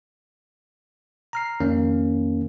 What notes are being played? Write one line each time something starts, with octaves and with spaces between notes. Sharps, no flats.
A#5 F6 C7
F2 D#3 A#3 C#4